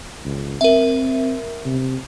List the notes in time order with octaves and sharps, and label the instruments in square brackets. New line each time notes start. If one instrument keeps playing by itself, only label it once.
[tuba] C#2
[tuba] C4 [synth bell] A#4 E5
[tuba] C3